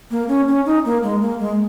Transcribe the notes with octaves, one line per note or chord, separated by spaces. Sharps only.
A#3
C#4
C#4
D#4
A#3
G#3
A#3
G#3